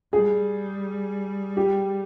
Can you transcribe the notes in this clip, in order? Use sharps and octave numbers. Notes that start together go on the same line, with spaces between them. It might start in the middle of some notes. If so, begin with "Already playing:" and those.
G3 G#4
G4